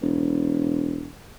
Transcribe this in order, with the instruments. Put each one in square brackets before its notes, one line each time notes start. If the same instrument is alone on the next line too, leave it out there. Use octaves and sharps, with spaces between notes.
[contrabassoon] E1